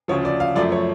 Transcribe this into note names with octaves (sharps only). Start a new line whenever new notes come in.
D2 C#3 F3 C#5
D5
F5
F#2 F3 A3 D5
C#5